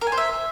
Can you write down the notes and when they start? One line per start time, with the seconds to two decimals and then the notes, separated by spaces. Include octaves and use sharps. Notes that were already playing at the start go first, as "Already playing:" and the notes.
0.01 A#4
0.07 G#5
0.12 C5
0.17 E5